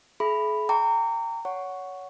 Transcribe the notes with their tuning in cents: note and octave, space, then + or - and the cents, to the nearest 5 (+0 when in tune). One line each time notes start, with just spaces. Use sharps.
G#4 +45 E5 +15 B5 +0
G5 +0 A#5 -25 D6 -40
C#5 +20 F#5 +0 C#6 +5